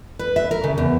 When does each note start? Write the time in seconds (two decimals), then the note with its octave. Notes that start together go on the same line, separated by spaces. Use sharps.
0.19 B4
0.36 E5
0.51 A#4
0.64 C#3
0.78 E2